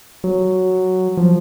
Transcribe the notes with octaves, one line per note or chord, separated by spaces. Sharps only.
F#3
F3